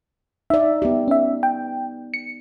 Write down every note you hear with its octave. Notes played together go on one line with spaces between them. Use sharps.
D#4 D5 E5
B3 G4
C#4 E5
G5
C#7